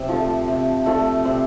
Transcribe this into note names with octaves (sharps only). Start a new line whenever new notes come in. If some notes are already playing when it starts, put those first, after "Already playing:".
Already playing: C3
F3 A3
C3
F3 A3
C3